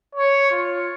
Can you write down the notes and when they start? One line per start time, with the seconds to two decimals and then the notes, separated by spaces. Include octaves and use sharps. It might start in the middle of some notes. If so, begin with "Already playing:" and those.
0.15 C#5
0.51 F4